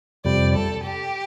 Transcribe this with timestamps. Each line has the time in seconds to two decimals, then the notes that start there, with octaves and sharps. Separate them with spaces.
0.25 F2 C3 G3 D5
0.55 A4
0.85 G4